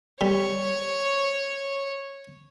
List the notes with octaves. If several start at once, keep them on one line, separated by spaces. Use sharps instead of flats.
G3 C#5